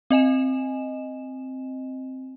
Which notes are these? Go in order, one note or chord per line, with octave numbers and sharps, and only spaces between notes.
C4 D#5 G#5 E7